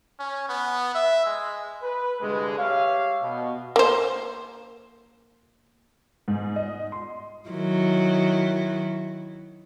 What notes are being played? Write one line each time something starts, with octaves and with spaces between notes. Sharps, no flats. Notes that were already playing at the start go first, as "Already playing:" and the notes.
C#4
B3
E5
G#3
B4
C2 G2 D3 G#3
G4 C#5 E5 F5
B2
A#3 C5
G#2
D#5
C6
D#3 F#3 E4